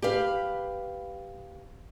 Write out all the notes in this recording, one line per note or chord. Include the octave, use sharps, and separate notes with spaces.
G4 B4 F5